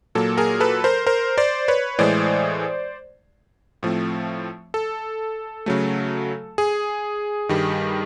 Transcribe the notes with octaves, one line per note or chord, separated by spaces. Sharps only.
A#2 F#3 A#3 A4
G#4 A#4
A4 B4
A#4 C5
A#4 C5
C5 D5
B4 C#5
A2 E3 G#3 C5 D5
A2 F3 A3 C4
A4
C#3 F#3 A3
G#4
G2 D#3 G3